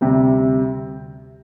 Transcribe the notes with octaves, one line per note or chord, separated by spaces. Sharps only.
D2 C3 G3 C4